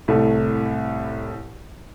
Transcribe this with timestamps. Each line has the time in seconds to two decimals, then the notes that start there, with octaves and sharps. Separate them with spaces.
0.08 C2 A2 A3